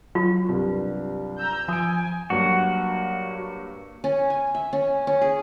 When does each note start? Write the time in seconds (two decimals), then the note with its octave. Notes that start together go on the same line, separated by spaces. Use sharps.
0.15 F#3 F4
0.48 C2 G2
1.37 A#5 E6 G6
1.68 F3 G#5 D#6 D7
2.30 G2 F#3 A#3 F#4
4.04 C#4
4.30 G#5
4.55 E5
4.73 C#4
5.07 C#4
5.21 G#4